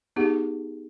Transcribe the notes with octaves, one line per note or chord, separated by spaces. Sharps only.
B3 D#4 G4 G#4 F#5